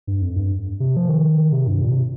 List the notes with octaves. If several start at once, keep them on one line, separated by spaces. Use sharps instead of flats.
G2
F2
G2
C3
F3
D#3
C3
G2
A#2
C3